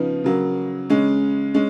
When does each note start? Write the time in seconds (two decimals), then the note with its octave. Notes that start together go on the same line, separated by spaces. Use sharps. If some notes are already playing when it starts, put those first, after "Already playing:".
Already playing: C#3 F3 B3 D#4
0.24 C#3 F#3 A#3
0.90 C#3 G#3 C#4
1.54 G#3 C#4